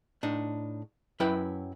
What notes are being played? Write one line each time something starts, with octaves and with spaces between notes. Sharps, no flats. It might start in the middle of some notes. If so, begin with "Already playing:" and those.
A2 D4 D#4
F#2 F#3 E4 B4 G5